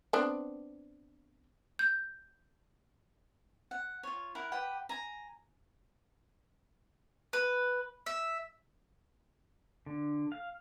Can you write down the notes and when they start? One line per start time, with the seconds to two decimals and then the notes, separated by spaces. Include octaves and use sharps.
0.13 B3 C4 D4
1.79 G6
3.71 F#5
4.03 F4 C#5
4.35 E4 A#4 F#5
4.52 G4 B4 F#5 G5
4.89 G#5 A#5
7.33 B4
8.06 E5
9.86 D3
10.32 F5